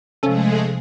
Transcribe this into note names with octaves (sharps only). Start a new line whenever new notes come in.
C3 F3 G#3 A3 C#4 G#4 A4